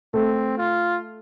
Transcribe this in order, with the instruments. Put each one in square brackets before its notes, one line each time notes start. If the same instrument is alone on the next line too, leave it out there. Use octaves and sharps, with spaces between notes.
[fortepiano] A3 [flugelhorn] C4
[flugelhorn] F4